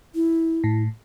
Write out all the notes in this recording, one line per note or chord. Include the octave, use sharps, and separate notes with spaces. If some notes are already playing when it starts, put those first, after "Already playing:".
E4
A2